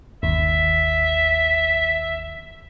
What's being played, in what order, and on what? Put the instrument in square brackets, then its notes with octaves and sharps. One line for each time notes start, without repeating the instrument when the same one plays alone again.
[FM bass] G1 [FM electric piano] D#2 [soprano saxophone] E5